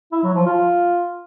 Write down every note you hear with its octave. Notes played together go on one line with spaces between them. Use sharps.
E4
F#3
F3
F4